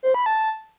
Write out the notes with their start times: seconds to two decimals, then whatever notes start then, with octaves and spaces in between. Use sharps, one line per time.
0.03 C5
0.14 B5
0.26 A5